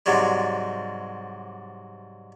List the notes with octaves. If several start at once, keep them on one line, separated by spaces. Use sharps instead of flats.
G#2 C3 F#3 G3